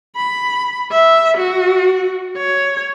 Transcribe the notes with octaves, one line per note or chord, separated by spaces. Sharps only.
B5
E5
F#4
C#5